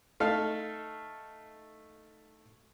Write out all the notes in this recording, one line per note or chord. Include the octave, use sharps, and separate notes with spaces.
A3 D#4 A4 F5